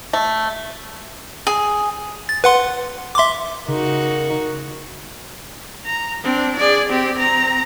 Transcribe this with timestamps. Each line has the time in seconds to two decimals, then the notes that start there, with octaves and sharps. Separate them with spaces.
0.13 A3
1.47 G#4
2.29 A6
2.44 B4 F#5 C6
3.15 E5 C6 D6
3.68 C#3 D#4 F#4 A#4
5.86 A#5
6.23 C4 D4
6.57 G#4 D5
6.89 C4 G4
7.18 C4 A#5